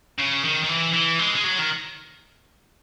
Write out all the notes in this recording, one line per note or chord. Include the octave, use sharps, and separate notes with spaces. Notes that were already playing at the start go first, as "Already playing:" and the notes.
C#3
D#3
D#3
E3
E3
G#3
G#3
F#3
D#3